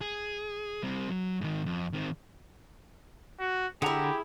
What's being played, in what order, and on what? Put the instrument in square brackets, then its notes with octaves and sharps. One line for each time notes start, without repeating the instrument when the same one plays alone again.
[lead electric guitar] G#4
G3 C4
F#3
G#2 D#3
F2
D#3 C4
[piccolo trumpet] F#4
[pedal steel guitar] D3 F#5 A#5 [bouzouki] E4 G#4 [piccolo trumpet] G4